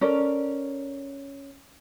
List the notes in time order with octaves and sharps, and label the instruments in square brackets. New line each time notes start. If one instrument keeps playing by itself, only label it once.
[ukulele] C#4 A4 A#4 D5